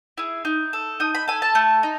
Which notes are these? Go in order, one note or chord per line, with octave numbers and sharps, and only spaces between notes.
E4 G#4
D#4
A4
D#4 D#6
B5
A4 G#5
A5
A3
D#4